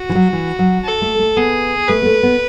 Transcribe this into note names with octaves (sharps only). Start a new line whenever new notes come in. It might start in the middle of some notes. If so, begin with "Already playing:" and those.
Already playing: F#4
E3
F#3
E3
F#3
A4
A3
A3
B3 G#4
A3 B4
B3
A3
B3